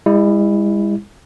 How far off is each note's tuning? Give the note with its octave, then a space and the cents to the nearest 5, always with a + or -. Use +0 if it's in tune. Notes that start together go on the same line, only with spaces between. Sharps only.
G#3 -45 E4 +0